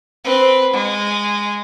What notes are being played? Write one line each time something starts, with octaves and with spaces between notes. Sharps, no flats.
C4 B4
G#3